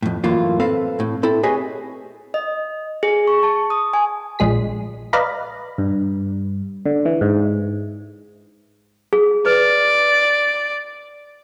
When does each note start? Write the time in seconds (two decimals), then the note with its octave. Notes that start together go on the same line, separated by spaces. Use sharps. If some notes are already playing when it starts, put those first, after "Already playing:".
0.02 F2 A2
0.24 F#2 A2 E3 A#3 F4
0.60 C4 A4 B4 F5
1.00 A2
1.23 C4 E4 A4
1.43 G4 G#4 B4 C#5 D#5 G#5
2.34 D#5
3.03 G#4
3.27 C#6
3.43 A5
3.70 D#6
3.93 G#5
4.39 A#1 G#3 G#4 B6
5.13 B4 D5 D#5 F5 A#5 B5
5.78 G2
6.86 D3
7.05 E3
7.21 G#2
9.13 G#4
9.46 B4 D5